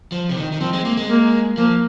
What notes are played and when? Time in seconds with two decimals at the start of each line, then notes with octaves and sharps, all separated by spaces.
0.12 F3
0.29 C3
0.37 D#3
0.52 D#3
0.60 F3 C4
0.73 G#3
0.85 A#3
0.97 G#3
1.09 A#3
1.57 F3 A#3